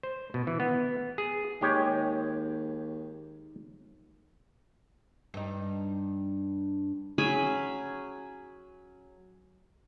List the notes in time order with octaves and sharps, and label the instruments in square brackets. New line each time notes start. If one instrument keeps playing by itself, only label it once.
[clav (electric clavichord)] C5
B2
E3
B3
G#4
[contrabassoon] D#2 [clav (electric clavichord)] G#3 G4 C#5
[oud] G2 D#4
[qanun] F#3 C#4 G#4 B5